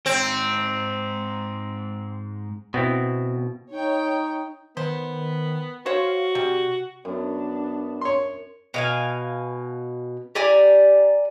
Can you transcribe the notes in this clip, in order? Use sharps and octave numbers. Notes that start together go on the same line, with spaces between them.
G#2 C4 G5
B2 B3 C4 E4
D#4 C#5 G5
D#3 B3 C5
F#4 C5 C#5 F5
C3 G3
F#2 B3 D4
C#5 C6
B2 F5 G#5
G4 D5 G#5 A#5